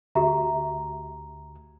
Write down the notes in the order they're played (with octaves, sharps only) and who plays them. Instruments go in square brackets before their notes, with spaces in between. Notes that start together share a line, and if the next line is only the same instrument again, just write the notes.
[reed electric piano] D2 [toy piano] F#4 G4 E5 [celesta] A#5